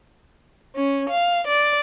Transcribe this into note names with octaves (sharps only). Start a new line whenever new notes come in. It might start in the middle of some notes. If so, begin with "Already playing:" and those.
C#4
F5
D5